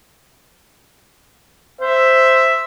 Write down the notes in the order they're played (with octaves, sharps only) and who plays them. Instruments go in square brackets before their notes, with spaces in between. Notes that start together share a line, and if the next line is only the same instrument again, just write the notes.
[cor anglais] C5 [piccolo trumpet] E5